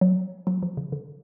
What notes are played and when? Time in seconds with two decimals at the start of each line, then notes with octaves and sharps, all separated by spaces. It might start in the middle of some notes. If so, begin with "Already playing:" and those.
0.01 F#3
0.47 F#3
0.62 F3
0.77 C#3
0.92 D3